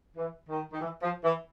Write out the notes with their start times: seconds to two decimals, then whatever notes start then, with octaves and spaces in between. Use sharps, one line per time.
0.16 E3
0.49 D#3
0.72 D#3
0.81 E3
1.02 F3
1.23 E3